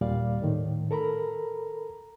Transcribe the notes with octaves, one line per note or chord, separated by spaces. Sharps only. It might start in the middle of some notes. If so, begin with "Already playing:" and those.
D#2 A#2 G3 D5 F5
A2 D#3
A4 A#4 A#5 B5